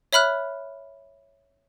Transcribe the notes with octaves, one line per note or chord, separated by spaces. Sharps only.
C#5 E5 B5 F6 F#6